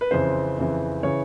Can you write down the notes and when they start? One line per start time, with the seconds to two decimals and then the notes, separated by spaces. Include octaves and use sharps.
0.01 B4
0.11 F2 C#3 E3 C5
0.58 F2 C#3 E3
1.03 C#3 E3 C#5